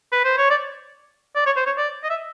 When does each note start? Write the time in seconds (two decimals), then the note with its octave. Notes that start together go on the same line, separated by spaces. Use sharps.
0.12 B4
0.25 C5
0.38 C#5
0.50 D5
1.36 D5
1.46 C#5
1.56 C5
1.66 C#5
1.78 D5
2.04 D#5
2.10 E5